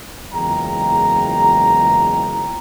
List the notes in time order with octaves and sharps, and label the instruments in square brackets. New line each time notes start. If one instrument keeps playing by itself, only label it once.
[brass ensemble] F#1 E2 G#3 F4 G5 A#5